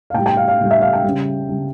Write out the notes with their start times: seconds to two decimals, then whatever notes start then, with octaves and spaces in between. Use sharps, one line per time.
0.10 F5
0.14 A2 G5
0.19 G3
0.26 G5
0.37 F5
0.48 F5
0.60 A2 G3
0.71 E5
0.82 F5
0.93 G5
1.04 C#3 G3
1.49 C#3 G3